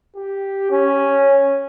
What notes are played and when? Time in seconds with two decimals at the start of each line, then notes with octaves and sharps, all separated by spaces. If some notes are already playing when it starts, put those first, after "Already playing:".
0.16 G4
0.71 C#4